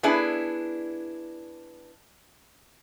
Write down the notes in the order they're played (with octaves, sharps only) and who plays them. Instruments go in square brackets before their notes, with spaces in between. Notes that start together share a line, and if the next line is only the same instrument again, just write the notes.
[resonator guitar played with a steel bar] B3 D4 E4 G#4